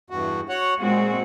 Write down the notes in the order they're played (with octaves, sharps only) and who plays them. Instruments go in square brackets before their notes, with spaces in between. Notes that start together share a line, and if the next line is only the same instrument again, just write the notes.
[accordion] E2 G2 F#4
F#4 C#5 F#5
[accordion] A#2 [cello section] G#3 C4 F#4